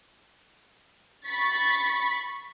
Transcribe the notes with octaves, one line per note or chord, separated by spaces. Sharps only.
B5 C#6 A6 B6